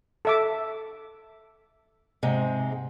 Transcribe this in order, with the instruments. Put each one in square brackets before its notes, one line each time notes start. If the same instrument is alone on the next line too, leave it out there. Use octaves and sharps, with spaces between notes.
[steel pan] A4 E5 D6
[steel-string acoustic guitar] G#2 C3 G#3